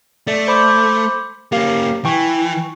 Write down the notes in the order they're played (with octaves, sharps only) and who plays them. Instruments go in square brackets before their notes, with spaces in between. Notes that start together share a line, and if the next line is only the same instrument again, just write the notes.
[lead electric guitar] A3 [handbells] D5 E5
[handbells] C5 B5 D6
[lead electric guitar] A#3 C#4 [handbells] G4 F5
[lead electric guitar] E3 [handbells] G5 G#5 C#6